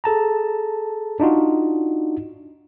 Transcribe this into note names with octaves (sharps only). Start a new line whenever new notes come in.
G#4 A4 A5 A#5
D4 D#4 F4 F#4